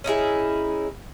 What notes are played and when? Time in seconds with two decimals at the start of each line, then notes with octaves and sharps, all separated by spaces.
0.04 C#4 D#4 E4 G#4